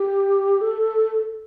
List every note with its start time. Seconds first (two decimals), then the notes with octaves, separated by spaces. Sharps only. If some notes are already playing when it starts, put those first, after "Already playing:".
Already playing: G4
0.61 A4